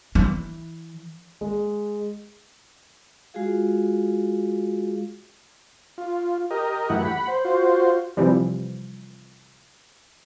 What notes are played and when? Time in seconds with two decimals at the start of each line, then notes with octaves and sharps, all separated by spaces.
0.15 E3
1.41 G#3
3.34 G#3 F4 F#4 G#4 F5
5.98 F4
6.51 G4 A#4 D#5
6.90 F#2 E3 A3 E4 G4 F#5
7.05 F#5 B5
7.28 C5
7.45 F4 F#4 C5
8.17 C3 E3 F3 G3